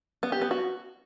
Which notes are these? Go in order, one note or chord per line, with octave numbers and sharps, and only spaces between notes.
B3
G4
B3
F#4